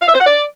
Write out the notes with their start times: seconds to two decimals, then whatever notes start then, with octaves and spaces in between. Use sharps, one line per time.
0.01 F5
0.08 E5
0.14 C5
0.20 F#5
0.26 D5